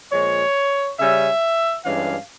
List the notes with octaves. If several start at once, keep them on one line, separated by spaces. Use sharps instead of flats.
A#2 F3 G#3 C#5
C#3 G3 C#4 E5
G2 E3 G#3 C#4 F5